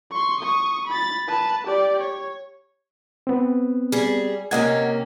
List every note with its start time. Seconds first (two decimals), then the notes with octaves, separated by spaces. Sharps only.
0.11 C6 C#6
0.40 C#6 D#6
0.87 B5 A6
1.28 B4 A5
1.67 G4 D5
2.00 C#5
3.27 B3 C4
3.92 G3 G#4
4.51 C3 A#3 C#4 D#5 F#5 G#6